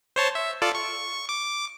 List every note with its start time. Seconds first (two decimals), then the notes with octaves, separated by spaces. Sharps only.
0.16 C5 C#5 A5
0.35 E5
0.62 F4 A4 D5
0.75 C#6
1.29 D6